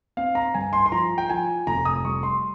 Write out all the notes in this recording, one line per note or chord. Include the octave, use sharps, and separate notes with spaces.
C4 F5
A#5
G2 G#5
C6
C6
F3 A#5
G5
F3 G#5
F1 A#5
D#6
G3 C#6
C6